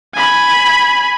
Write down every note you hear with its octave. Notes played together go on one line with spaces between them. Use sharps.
G#5 B5